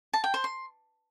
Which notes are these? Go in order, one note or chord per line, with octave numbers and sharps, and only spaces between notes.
A5
G5
C5
C6